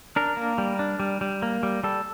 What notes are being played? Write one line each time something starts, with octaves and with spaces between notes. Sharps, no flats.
D4 A#4
A#3
G3
D4
G3
G3
A#3
G3
G3 A4